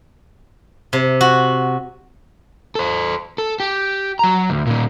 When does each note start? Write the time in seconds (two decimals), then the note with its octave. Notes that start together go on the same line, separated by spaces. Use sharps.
0.93 C3
1.21 F#4
2.75 A4 C5
3.38 A4
3.60 G4
4.19 F#3 A#5
4.50 D2
4.66 A#2 D#3